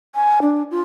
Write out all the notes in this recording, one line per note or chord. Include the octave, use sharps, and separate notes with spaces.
G#5
D4
F4